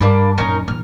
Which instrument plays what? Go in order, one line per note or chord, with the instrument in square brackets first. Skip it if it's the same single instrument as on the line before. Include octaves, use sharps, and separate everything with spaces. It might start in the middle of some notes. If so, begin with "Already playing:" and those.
[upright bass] G2 [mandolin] A#3 D4 B5
[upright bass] A#1 F#2 [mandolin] C#4 D#4 A#4
[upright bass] A#1 E3 [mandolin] F6